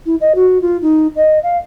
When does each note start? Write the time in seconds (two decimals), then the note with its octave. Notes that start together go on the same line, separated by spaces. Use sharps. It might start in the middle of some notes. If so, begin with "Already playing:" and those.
0.06 E4
0.20 D#5
0.35 F#4
0.61 F4
0.82 D#4
1.16 D#5
1.43 F5